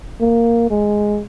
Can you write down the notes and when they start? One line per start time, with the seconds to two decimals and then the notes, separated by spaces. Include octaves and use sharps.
0.21 A#3
0.70 G#3